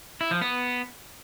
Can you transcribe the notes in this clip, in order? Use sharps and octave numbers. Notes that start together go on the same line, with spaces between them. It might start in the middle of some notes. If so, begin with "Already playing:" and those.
E4
F3
B3